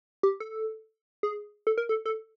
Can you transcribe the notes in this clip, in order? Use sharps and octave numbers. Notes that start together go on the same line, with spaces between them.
G4
A4
G#4
A4
A#4
A4
A4